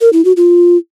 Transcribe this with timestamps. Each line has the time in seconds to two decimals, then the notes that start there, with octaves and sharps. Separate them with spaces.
0.01 A#4
0.13 E4
0.25 F#4
0.37 F4